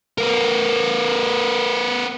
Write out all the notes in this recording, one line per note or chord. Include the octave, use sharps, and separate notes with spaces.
B3 A#4